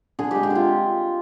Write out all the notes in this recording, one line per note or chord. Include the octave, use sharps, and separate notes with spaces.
D3 G#4
G#3 G4
G4
D3 F4